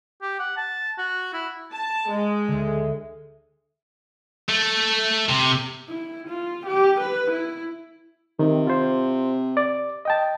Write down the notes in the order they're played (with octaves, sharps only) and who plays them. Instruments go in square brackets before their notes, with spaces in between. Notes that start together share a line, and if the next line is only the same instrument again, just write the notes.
[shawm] G4
F#5
A5
F#4
E4
[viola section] A5
G#3
[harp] D2 D3
[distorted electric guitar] A3
C3
[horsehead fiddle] E4
F4
G4
B4
E4
[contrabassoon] C3 [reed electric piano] D#3
[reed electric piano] F4 C5
D5
D#5 G5 A5